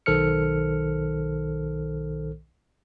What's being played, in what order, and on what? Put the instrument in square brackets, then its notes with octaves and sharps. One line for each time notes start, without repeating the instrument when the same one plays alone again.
[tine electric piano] B1 D#3 A4 C5 F6 C#7